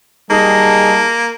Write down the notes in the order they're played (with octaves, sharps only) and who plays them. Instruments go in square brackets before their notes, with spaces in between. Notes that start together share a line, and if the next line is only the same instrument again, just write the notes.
[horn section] G3 D#4 G#4 [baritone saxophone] A#3 [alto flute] A5